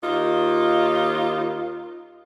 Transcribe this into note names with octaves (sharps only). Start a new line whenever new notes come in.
D#2 D#4 F4